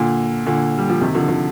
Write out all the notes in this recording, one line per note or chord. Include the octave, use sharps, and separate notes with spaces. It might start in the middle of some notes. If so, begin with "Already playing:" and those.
Already playing: A#2 D3
A#2 D3
G3
F3
C3 D#3
D3 F3
D3 F3